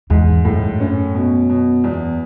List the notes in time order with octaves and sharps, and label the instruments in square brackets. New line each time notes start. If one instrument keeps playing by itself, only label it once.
[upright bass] E2 [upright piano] G#2
[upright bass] F#2 [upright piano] A2
[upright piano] C#4
B2
B2
E2